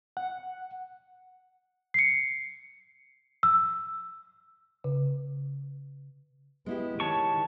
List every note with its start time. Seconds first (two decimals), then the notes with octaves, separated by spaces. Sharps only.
0.17 F#5
1.94 C7 C#7
3.43 E6
4.84 C#3
6.66 G#3 B3 E4 G4
7.00 D#3 C#5 A5 C#6